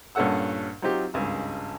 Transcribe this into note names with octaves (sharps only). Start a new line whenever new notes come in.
G2 A#2 C#4 A4 F#5 E6
F#3 C4 D#4 F4 G4
G#1 C#2 G2 G#5